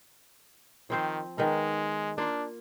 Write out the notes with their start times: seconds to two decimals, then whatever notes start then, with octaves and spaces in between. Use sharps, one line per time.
0.90 D#3 F3 C4 C5
1.38 D#3 G#3 B3 A#4
2.18 A#3 D4 F4